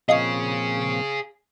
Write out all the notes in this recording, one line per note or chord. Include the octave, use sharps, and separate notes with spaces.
A#2 F3 C4 G#4 C#5 D#5 F5 D#6